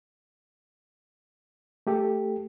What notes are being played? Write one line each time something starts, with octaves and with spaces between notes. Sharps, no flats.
A3 G4 A4